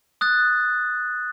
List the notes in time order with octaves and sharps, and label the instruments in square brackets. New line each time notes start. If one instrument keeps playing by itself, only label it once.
[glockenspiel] D#6 F#6 A6